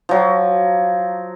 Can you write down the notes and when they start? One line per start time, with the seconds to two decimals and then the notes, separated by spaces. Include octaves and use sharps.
0.09 F3 F#3